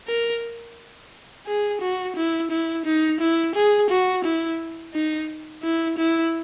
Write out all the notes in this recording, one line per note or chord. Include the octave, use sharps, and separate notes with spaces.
A#4
G#4
F#4
E4
E4
D#4
E4
G#4
F#4
E4
D#4
E4
E4